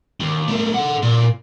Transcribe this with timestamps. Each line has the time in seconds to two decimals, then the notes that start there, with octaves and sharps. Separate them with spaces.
0.20 D#2
0.48 A3 A#3
0.74 A4 F#5
1.02 A#2